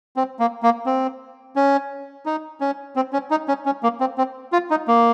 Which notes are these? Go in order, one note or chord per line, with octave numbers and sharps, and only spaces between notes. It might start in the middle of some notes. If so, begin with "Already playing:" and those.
C4
A#3
A#3
C4
C#4
D#4
C#4
C4
C#4
D#4
C#4
C#4
A#3
C4
C4
F4
D#4
A#3